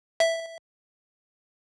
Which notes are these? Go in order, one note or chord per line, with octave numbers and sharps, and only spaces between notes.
E5